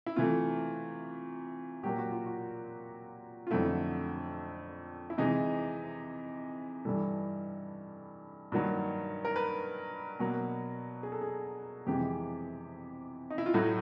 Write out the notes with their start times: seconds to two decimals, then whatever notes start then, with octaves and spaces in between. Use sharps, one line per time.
0.06 E4
0.16 C3 E3 A3 F4
1.83 A#2 F#3 A#3 G4
1.98 F#4
2.12 F4
2.26 F#4
3.47 F4
3.51 F2 D3 F#3 A3 E4
5.10 E4
5.18 C3 E3 G#3 D#4
6.85 G2 E3 G3 A4
8.52 G2 D#3 F#3 A#3
9.25 A#4
9.36 B4
10.19 B2 F#3 A#3
11.03 G#4
11.12 A4
11.21 G#4
11.87 F2 C3 E3 G#3 G4
13.30 D#4
13.38 E4
13.46 F4
13.54 A2 F#3 A3 F#4